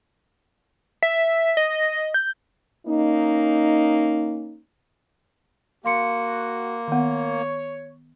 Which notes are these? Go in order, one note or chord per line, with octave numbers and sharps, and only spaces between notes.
E5
D#5
G6
A#3 C#4 D#4
A#3 F#4 F5 C6 C#7
D#3 B3 C#5